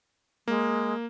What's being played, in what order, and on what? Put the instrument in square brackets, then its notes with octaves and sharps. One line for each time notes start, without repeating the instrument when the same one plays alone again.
[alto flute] G#3 [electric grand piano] A#3